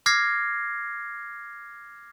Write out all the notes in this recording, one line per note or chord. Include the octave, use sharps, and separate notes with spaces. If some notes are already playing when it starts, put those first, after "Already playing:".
D6 F6 G#6 A#6 C7